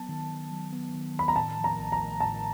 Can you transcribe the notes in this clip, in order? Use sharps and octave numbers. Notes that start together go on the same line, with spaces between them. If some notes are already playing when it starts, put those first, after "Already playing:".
Already playing: F#3 B3 A5
D#3
D#3
F#3
B3
D#3
D#3 B5
A#5
A2 A5
F3
A#5
A1
A#5
A3
A2 A5